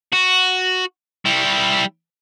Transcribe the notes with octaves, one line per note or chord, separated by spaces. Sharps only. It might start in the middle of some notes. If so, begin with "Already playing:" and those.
F#4
G3 E4